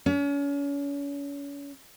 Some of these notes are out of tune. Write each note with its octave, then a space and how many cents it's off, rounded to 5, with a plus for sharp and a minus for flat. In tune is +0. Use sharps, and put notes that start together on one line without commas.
C#4 +35